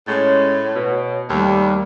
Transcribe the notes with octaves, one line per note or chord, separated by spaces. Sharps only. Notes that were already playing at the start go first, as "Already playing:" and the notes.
A2 G#3 C#4 C#5
B2
D#2 D#3 G3 A3